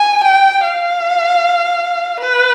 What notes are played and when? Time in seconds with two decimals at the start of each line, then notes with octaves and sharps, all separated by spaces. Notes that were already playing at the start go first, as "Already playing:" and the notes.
Already playing: G#5
0.24 G5
0.64 F5
2.21 B4